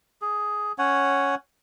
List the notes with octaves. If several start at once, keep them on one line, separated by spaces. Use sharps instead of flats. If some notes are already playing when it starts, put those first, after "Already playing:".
G#4
C#4 C#5 F#5